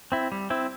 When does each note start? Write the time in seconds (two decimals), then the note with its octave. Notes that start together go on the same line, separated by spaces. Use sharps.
0.12 C4 E4
0.32 G3
0.50 C4 E4